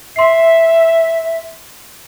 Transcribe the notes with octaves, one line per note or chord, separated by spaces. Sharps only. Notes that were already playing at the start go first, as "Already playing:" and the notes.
E5 C6 C7